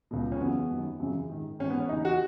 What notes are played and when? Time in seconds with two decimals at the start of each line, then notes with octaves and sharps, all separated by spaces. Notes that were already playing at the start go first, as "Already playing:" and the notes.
0.11 C#2 B2
0.32 C#4
0.40 F#2 C#3 E3 B3
0.70 F#2 D#3
1.00 F#2 C#3 E3
1.30 G#2 D#3
1.59 G#2 C#4
1.63 E3
1.70 B3
1.80 C#4
1.89 D#2 C#3 E3 D#4
2.05 F#4